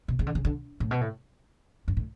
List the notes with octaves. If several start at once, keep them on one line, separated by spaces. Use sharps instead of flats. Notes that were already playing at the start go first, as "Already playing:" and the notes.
B2
C#3
D3
C#3
D3
A2
B2
A2
G2
A2